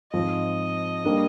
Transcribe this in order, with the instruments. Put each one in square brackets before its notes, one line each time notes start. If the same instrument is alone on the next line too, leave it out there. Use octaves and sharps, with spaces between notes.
[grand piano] G#2 F3 C4 F4 [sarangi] D#5
[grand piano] G3 A#3 D4